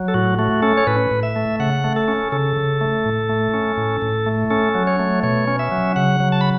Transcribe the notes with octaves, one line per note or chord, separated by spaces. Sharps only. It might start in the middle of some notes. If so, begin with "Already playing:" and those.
Already playing: F#3
A4
A2 F#4
A3 F#4
C#4 A4
C#5
A2 B4
A2
E5
A3
C#3 F#5
A3
A4
C#4
C#3 A4
C#3
A3
A2
A3
C#4
A2
A2
A3
C#4 A4
F#3
C#5
A3
B2 C#5
C#4
E5
F#3
C#3 F#5
F#3
A5
B5